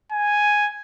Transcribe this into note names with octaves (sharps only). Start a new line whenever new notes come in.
G#5